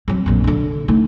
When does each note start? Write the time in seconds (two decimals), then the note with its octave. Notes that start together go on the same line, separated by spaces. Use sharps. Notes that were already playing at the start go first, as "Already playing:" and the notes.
0.08 F#3 C4
0.26 A#1 F#2
0.44 D3 D4
0.88 D#3 A3